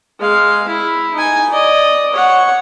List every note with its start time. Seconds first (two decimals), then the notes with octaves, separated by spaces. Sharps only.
0.20 G#3 F5
0.68 E4
1.15 D#4 G#5
1.50 D5 D#5
2.12 C#5 F#5